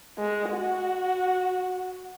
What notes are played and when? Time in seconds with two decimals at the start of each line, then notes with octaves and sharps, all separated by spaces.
0.18 G#3
0.51 F#4